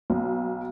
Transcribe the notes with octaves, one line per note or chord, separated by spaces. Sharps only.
B1